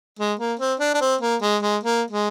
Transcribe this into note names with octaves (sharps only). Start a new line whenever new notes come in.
G#3
A#3
C4
D4
D4
C4
A#3
G#3
G#3
A#3
G#3